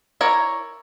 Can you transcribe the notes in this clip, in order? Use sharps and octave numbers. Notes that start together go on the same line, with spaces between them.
E4 A#4 C#5 D5